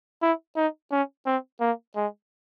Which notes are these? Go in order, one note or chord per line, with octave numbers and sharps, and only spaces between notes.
E4
D#4
C#4
C4
A#3
G#3